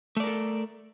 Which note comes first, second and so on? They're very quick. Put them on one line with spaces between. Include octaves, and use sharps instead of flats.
A3 D5 A#4 A4